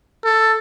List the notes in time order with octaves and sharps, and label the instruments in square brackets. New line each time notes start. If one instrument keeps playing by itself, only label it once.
[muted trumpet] A4